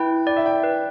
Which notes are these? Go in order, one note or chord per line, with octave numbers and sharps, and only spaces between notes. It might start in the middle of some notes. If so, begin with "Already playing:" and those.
Already playing: E4 B4 G5
D5 G5
E5
G5
B4